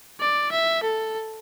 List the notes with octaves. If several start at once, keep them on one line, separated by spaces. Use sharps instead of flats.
D5
E5
A4